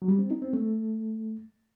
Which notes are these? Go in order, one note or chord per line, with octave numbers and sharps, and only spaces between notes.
F#3
G3
C4
D#4
C4
A3